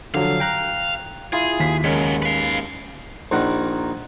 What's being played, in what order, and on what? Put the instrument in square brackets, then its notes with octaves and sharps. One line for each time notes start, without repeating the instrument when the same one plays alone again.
[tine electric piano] D3 F3 F#3 [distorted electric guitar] F5
[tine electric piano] G5 A#5 F#6
[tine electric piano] E4 F4 [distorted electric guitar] G#4
[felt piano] D#2 B6
[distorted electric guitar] C#3 F#3 [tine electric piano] G#3 C#4 A#4
[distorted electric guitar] B4 F5
[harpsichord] A#1 D#3 A#4 F#5